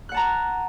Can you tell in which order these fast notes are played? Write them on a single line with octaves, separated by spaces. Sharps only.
F#6 F#5 A5 A#5